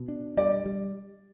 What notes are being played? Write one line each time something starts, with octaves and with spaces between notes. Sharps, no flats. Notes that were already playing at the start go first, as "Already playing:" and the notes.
Already playing: B2
D4
G3 D5
G3